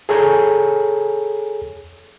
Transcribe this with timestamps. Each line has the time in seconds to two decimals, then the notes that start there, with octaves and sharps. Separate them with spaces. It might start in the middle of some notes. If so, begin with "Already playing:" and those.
0.09 G#4 A4 C#5 G#5 A#5 G6